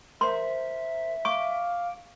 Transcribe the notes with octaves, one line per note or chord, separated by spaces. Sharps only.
A#4 C5 E5 C6
F5 C#6 D6